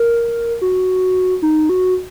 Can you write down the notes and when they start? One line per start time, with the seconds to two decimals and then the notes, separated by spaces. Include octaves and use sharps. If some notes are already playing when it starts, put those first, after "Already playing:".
Already playing: A#4
0.62 F#4
1.42 D#4
1.69 F#4